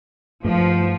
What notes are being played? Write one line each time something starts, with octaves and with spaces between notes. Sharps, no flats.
G2 F3 A3